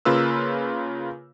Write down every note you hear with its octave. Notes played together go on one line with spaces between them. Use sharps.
C#3 A#3 F4 B4 E6